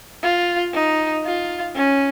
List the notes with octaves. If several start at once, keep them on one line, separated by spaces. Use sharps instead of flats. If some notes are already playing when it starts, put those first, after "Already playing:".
F4
D#4
F4
C#4